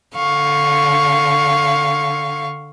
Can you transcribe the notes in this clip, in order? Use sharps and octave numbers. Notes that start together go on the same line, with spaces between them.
D3 F5 C#6